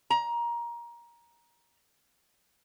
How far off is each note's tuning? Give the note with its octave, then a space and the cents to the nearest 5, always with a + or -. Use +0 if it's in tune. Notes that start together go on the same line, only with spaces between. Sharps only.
A#5 +20